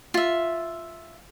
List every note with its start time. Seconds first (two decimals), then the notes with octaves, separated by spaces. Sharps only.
0.14 F4 E5